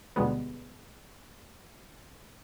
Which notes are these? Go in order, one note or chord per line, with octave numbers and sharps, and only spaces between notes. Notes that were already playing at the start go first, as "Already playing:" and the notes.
D2 B2 G3 G#3 B3